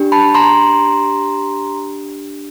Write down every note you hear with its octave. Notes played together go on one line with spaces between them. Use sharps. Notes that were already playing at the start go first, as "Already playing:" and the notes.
Already playing: D4 G4
A5 B5
A#5 C6